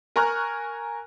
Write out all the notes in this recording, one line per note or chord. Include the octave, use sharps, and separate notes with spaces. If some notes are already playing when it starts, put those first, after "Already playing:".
A#4 G#5 A#5 C#6 F6 F#6